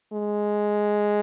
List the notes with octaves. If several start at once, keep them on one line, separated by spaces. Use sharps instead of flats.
G#3